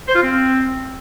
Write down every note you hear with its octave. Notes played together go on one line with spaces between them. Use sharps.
C5
F4
C4